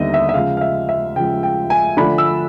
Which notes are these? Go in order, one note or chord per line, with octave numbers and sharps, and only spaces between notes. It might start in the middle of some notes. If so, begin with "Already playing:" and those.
Already playing: D#2 D3 G3 B3 D#4 D#5 E5
E5
E5
C#3 F3 G#3 F5
F5
E5
E5
C#3 F3 G#3 G5
G5
G#5
D3 F3 A3 D4 B5
E6